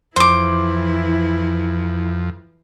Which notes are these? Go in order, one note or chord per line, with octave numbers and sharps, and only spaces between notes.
F2 E3 E4 C5 D6